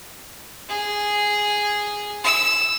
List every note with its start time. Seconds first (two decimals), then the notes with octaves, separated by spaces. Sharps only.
0.69 G#4
2.24 E6